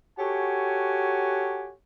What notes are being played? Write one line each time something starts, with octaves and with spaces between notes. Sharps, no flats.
F#4 G4 A4 C#5 F#5 G#5